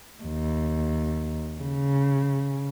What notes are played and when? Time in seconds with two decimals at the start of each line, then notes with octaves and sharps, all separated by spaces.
0.24 D#2
1.62 C#3